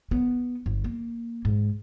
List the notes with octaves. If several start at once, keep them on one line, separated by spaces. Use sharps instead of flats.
B3
G1
A#3
G#2